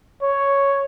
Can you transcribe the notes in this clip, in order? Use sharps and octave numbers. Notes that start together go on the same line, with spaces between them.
C#5